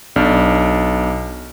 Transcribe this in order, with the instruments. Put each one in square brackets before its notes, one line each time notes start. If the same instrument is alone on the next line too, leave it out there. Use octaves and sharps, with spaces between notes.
[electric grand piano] B1 D4 F6